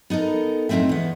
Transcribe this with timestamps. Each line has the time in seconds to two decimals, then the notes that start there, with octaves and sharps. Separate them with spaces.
0.10 B3 D#4 A4 A#4
0.69 F#2 A2 G#3 C4 D#4 E5
0.89 E2 B3